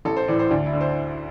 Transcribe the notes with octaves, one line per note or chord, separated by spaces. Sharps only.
A1 A4
C5
A2 E3 D5
C5
D2 D4
E4
D3
C5